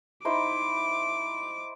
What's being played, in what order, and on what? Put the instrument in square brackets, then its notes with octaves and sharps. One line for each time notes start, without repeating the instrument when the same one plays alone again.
[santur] D#4 E4 C5 [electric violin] D6